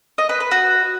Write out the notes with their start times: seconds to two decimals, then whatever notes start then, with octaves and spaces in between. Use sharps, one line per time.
0.18 D#5
0.29 B4
0.40 B4
0.51 F#4